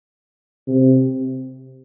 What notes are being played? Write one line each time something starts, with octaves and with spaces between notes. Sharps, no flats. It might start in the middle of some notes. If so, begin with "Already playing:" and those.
C3